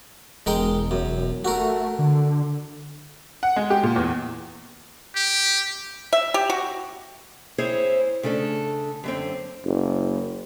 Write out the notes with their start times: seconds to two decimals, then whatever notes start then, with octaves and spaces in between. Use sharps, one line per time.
0.46 E1 G#3 A#4 G5
0.91 F#2
1.45 A3 F#4 A#4
1.99 D3
3.43 F#5
3.56 G#3
3.70 G4
3.83 A#2
3.96 E2
5.16 G4
6.13 E5
6.34 G4
6.50 F#4
7.58 C4 E4 G#4 C5 C#5
8.23 C#3 A3 D4 A4
9.04 F#2 D3 C4
9.64 F#1